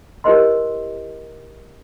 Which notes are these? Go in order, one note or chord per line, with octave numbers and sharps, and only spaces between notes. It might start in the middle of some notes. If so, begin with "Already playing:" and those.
E4 G4 A#4 C5 D#5 C6